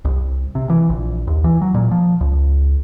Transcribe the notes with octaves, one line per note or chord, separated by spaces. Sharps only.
C2
C3
E3
A#1
D#2
E3
F#3
A#2
F3
C#2